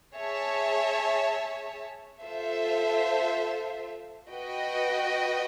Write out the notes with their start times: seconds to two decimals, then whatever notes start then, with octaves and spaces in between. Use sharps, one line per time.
0.15 G#4 C#5 E5 A5
2.22 F4 A4 C5 E5
4.29 F#4 B4 D#5 G5